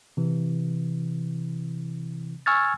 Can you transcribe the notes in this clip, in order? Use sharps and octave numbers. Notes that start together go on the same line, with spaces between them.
C3 E3
G#5 C#6 E6 F6 G#6 A6